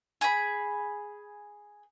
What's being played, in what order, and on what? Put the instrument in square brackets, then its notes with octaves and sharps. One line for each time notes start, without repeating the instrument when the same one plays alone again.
[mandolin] G#4 B5